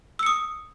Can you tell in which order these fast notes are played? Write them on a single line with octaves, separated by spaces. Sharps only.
E6 C#7 D#6